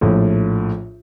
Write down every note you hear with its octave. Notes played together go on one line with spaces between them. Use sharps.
A#1 A2